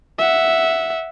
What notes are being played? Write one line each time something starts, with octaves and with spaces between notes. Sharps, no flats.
E5 F#5